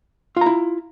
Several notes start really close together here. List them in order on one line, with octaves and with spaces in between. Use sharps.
F4 A#5 E4